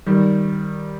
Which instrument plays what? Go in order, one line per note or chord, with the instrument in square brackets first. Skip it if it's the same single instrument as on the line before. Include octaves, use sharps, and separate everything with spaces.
[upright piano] D#3 G3